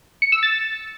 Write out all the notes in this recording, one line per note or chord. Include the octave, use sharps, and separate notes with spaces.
C#7
E6
A6